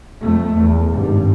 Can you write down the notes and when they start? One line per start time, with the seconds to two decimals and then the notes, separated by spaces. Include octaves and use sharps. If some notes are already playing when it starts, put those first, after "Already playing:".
0.19 F2 A3
0.54 E2
0.92 G#1 G2